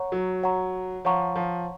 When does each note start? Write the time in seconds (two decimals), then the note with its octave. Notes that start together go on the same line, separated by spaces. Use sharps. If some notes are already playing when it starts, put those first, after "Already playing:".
Already playing: C#5 F#5 A#5 C#6
0.12 F#3
0.43 C#5 F#5 A#5 C#6
1.05 F3 C#5 F#5 A#5 C#6
1.36 F3